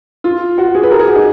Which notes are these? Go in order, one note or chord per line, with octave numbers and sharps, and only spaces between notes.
F4
F#4
G#4
B4
A#4
G#4
F#4
D#4